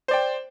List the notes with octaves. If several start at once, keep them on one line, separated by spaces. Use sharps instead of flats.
C5 D5 G5